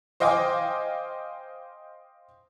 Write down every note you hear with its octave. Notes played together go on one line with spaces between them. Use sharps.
C5 D#5 F5 G5 G#5 D6